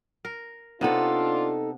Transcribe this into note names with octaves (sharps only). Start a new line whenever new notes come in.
A#4
C3 B3 D4 D#4 F4 A4